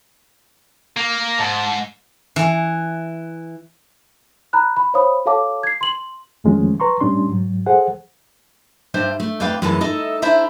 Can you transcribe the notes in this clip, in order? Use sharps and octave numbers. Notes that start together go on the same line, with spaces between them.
A#3
G#2 A5
E3
A#5 B5 F#6
B5
C5 C#5 F5 B5 D#6
F#4 A4 C#5 F5 A5 D6
G#6 C7
C6 F#7
F2 D#3 F3 G#3 A3 C#4
B4 A#5 C6 C#6
A2 G3 C#4 D4 C6
G#2 F#3
G#4 A4 C5 F#5
G2 D4 C5 E5
A3
F2 D4 B4 F5 G5
F#2 A2 E3 G#3 A5
D#4 A4 D#5 E5
D4 E4 C5 E5 A#5